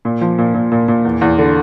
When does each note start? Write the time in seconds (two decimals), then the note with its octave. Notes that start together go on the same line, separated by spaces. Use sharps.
0.05 A#2
0.21 F3
0.38 A#2
0.54 A#2
0.71 A#2
0.88 A#2
1.05 E2
1.21 E2
1.38 D3